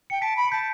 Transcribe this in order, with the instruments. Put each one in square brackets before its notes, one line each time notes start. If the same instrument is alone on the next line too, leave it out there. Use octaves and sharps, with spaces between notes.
[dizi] G5 [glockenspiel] C#7
[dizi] A5 [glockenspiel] B6 D7
[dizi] B5
[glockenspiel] C#7
[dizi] A5 [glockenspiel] G6 B6